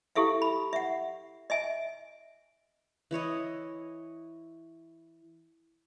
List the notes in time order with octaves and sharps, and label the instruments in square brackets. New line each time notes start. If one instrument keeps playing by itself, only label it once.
[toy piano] E4 G4 A4 E5 F5
B5
E5 F#5
D#5 E5 G#5
[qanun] E3 E4 C#5 D#5